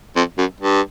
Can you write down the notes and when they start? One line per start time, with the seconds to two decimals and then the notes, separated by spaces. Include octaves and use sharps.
0.16 F2
0.38 F#2
0.60 G2